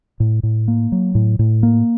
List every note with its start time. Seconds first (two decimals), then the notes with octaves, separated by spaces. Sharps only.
0.20 A2
0.43 A2
0.68 A#3
0.92 F#3
1.15 A2
1.39 A2
1.63 A#3